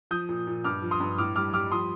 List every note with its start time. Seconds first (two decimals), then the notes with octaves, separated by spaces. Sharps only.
0.11 F3 D#6 G6
0.29 A#2
0.47 A#2
0.64 G2 D6 F6
0.82 F3
0.91 C6 D#6
1.00 G2
1.18 A2 D6 F6
1.36 G3 D6 F6
1.53 G3 D6 F6
1.72 F3 C6 D#6